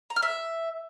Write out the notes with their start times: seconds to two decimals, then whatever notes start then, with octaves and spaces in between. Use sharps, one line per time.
0.10 A#5
0.16 F6
0.22 E5